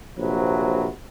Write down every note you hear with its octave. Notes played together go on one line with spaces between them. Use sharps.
A#1 C3 F#3 B4